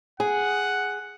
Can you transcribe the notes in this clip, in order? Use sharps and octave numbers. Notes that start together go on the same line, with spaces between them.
G#4 F#5